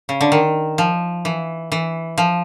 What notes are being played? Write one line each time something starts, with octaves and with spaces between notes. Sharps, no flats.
C#3
D3
D#3
F3
E3
E3
F3